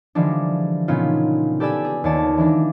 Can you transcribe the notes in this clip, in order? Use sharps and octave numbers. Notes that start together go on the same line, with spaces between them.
D3 E3 F3 G3 G#3 D4
A#2 C#3 B3 C#4 D#4 F4
G4 A4 B4 D5 G#5 E6
G#4
D#2 D#3 C#5 D5 A5
E3 G#3 D4